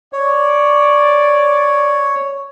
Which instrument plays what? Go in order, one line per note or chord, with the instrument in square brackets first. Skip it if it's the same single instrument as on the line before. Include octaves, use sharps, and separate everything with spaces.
[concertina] C#5 [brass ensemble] D5